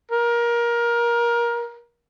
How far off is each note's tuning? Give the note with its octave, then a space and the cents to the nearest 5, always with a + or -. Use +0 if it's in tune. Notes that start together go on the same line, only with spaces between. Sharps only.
A#4 +20